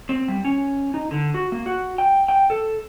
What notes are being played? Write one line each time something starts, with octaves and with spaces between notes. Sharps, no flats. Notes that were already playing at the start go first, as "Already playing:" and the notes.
C4
G3
C#4
D#4
D3
F#4
A#3
F#4
G5
G5
A4